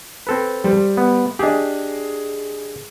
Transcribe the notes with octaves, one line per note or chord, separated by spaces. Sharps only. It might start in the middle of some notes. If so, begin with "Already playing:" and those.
C4 A4 B4
G3 C5
B3
D4 G4 G#4 D#5